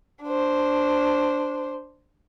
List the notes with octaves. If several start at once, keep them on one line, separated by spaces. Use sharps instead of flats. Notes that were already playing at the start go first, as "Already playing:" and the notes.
D4 C5